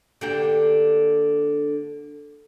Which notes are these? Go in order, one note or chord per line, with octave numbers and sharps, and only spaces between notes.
D3 A#3 G4